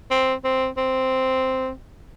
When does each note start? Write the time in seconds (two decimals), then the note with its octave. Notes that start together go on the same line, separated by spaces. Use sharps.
0.11 C4
0.44 C4
0.77 C4